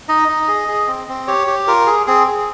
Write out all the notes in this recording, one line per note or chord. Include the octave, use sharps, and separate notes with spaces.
D#4 D#5
D#4
G#4
G#4
C4
C4
G4 C#5
G4
F4 A#4
G#4
C4 G#4
G#4